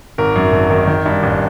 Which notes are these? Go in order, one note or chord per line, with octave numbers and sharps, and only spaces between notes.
G#1 A#4
F#2
G#1
D#3
D#3
G2
A1